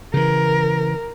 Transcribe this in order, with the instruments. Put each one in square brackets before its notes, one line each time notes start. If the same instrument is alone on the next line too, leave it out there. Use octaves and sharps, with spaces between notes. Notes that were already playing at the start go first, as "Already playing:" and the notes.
[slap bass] C#3 E3 [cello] A#4